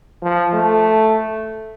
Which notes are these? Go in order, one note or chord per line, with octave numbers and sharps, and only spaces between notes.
F3
A3